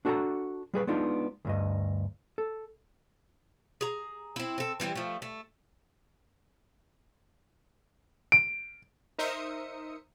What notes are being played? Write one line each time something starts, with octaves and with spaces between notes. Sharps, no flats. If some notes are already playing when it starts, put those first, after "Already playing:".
D4 F#4 A4 D#5 F#5 A#5
G3 G#4 B4
G#3 B3 D4 D#4 F4
D2 G2 D#5
A4
G#4 A#5
C4 E4
C4 A4
E3 G3 C4 E4
F3 A3
A3
D7
D#4 A#4 C5 E5 D#6 C#7